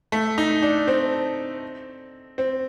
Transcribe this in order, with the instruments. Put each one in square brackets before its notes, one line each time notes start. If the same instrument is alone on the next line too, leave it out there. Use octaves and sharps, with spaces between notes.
[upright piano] A3
D#4
D4
C4
C4